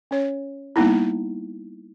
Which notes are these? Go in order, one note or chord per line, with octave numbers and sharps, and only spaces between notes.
C#4 C#5
G3 A#3 B3 D#4 E4